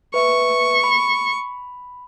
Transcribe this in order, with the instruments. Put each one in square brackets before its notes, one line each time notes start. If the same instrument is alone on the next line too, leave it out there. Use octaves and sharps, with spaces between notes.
[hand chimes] B4 E5 [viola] C#6
[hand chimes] B5